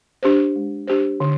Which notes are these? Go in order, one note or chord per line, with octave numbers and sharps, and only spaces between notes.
D4 G4 C5
G#3
D4 G4 C5
D3